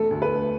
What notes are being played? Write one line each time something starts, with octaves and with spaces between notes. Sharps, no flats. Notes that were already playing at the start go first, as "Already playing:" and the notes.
Already playing: E1 A3 A4
D2
B4
A3